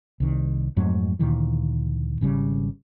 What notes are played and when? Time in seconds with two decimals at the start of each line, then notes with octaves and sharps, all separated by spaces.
0.20 C2 D#3
0.77 F2 G#2 F#3 A3
1.19 D2 A#2 D#3 E3
2.21 G#1 C#3 G3